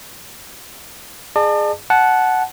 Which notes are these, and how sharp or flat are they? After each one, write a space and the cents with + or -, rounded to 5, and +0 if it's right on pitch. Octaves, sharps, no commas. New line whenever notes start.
G#4 +0 D5 +45 A5 +15
F#5 +0 A5 -20